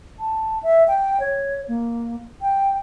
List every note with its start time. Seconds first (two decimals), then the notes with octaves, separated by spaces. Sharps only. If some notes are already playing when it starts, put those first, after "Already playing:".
0.19 A5
0.63 E5
0.88 G5
1.20 C#5
1.68 A#3
2.41 G5